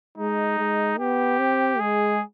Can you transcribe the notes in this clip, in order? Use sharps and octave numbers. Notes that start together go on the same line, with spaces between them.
G#3 D#4
G#3
B3 G4
C4
G#3 G#4